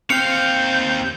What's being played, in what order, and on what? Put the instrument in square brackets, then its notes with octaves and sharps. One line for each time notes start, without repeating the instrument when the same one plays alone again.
[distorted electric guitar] D#2 F5 [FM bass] C4 [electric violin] G6 [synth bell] C#7